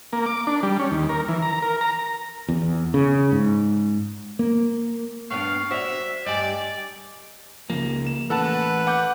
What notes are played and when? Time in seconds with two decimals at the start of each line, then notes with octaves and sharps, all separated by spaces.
0.13 A#3
0.26 D6
0.47 D4
0.63 G3
0.79 C#4
0.91 D#2
1.09 A#4
1.28 E3
1.42 A#5
1.62 A#4
1.81 A#5
2.49 E2
2.94 C#3
3.32 G#2
4.39 A#3
5.31 G2 B3 D4 F5 C#6
5.71 F#4 C5 D5 E5
6.26 G2 G3 D5 D#5 G#5
7.70 C#2 C#3 F3 A#3
8.07 E7
8.30 A1 A2 E3 A4 B4 F#5 A5
8.87 F#5 D6 G6